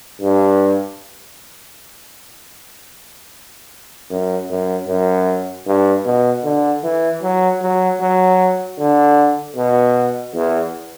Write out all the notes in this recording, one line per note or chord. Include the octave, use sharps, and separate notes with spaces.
G2
F#2
F#2
F#2
G2
B2
D3
E3
F#3
F#3
F#3
D3
B2
E2